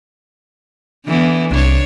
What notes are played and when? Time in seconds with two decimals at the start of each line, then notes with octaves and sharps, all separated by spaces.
1.06 D3 E3 B3
1.51 C2 D4 C#5